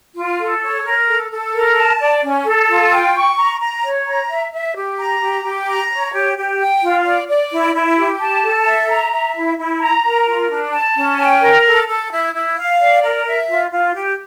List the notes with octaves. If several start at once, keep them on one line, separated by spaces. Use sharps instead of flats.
F4
A4
C#5
A#4
A4
A4
A#4
A5
D5
C#4
A4
F4
G5
C#6
A#5
A#5
C#5
A#5
E5
E5
G4
A#5
G4
G4
A#5
C#5
G4
G4
G5
F4
D5
D5
E4
E4
G4
A5
A4
E5
A#5
E5
E4
E4
A#5
A#4
F4
D4
A5
C#4
G5
A#4
A4
A4
E4
E4
F5
D5
A#4
E5
F4
F4
G4